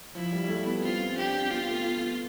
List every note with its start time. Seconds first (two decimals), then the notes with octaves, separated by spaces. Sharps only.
0.15 F3 E4
0.32 G3
0.44 G3
0.49 A3
0.66 B3
0.83 C4 F4
1.12 C4
1.17 D4 G4
1.35 C4
1.46 C4
1.51 B3 F4
1.68 A3
1.86 B3